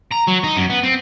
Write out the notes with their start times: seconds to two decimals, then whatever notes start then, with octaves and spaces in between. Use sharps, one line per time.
0.11 A#5
0.27 F#3
0.44 D#4
0.57 F#2
0.70 B3
0.83 C4